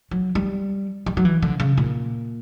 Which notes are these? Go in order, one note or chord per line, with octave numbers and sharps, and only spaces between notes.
F#3
G3
G3
F#3
E3
D3
C#3
A#2